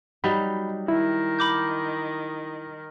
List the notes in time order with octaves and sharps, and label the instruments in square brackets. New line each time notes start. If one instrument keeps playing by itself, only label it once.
[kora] F#3 G3 D#4 [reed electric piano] B5
[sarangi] D#3 [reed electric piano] E4
[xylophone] B5 D6 G6